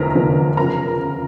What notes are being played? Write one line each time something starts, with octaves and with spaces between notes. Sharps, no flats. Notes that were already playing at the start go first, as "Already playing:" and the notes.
Already playing: F1 E2 D3 F3 A#4 A#5
F1 E2 D3 F3
C#3 F3 A#4 A#5